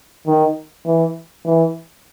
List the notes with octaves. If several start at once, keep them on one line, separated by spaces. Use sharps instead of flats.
D#3
E3
E3